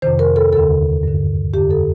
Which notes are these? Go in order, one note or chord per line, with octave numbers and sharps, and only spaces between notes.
F2 C3 D#3 C5
A#4
A4
D#2 D3 A4
G2 D3
F2 D3 G4
A4